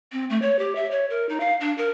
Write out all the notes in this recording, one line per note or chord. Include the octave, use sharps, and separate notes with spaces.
C4
A3
C#5
G4
E5
C#5
A#4
D#4
F5
D4
A#4